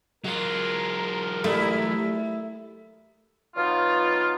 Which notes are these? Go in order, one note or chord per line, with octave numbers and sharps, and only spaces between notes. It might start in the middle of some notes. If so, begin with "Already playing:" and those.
F#3 G#3 F4 A#4
G3 A3 E4
B2 F#3 B3 D#4 F4